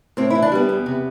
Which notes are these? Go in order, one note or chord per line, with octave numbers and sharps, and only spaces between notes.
A2 C4
E4
E3
D4
G3 B3
E2
C3